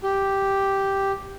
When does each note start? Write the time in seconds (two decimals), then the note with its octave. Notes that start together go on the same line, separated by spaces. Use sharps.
0.03 G4